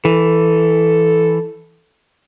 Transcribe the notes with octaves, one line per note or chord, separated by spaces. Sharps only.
E3 A4